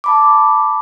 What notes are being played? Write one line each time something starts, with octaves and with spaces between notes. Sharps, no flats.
A5 B5 D6